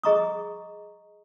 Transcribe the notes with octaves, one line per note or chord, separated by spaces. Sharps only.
G#4 D#5 A#5 C#6 D#6